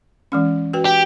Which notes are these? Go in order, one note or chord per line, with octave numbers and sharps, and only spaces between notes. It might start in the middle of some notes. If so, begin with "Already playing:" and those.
E3 G#3 C#4
F#4 B4 G5
G4